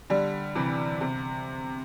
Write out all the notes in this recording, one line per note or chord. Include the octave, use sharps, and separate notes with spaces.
D3 G3
C3 E3
C3